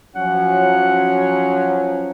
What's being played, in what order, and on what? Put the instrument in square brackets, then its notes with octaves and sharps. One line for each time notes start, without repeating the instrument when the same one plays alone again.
[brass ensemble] F3 F#3 C#4 [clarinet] F#5